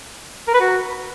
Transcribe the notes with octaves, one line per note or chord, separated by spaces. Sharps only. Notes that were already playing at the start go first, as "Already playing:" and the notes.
A#4
B4
F#4